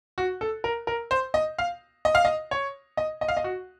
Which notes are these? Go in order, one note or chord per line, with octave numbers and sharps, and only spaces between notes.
F#4
A4
A#4
A#4
C5
D#5
F5
D#5
F5
D#5
C#5
D#5
D#5
F5
D#5
F#4